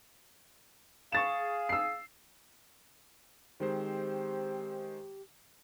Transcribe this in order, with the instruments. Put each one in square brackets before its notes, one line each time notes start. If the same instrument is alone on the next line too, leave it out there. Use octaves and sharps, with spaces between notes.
[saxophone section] G#4 F5 [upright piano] C#6 A6 E7
[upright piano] E6 C7
[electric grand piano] D#3 G#3 C5 [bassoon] C4 [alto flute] G4